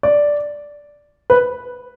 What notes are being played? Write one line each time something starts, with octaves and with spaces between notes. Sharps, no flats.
D5
B4